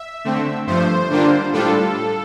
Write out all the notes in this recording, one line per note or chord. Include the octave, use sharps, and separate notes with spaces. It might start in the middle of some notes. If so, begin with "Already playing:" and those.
Already playing: E5
D3 A3 C4
G2 F3 A3 C5
D3 G3 A#3 D4 F4
A2 G3 D4 F4 A4